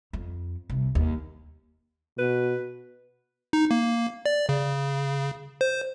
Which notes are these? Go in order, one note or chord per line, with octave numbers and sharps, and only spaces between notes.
F2
C2
D#2
B2 B4
D#4
A#3
D5
C#3
C5